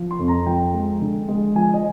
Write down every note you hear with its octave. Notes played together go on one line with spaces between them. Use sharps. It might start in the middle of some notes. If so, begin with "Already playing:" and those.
Already playing: F3
C6
F2
A#5
F3 G5
G#3
D3
G#3
F3 G#5
D#5